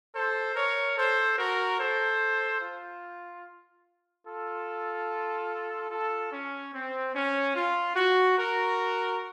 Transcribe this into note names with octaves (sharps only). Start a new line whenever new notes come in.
A4 C5
A#4 C#5
A4 C5
F#4 A#4
A4 C5
F4
F4 A4
F4 A4
C#4
C4
C#4
F4
F#4
F#4 A#4